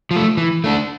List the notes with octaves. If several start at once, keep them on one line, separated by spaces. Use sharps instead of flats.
F3
A3
E3
A3 D4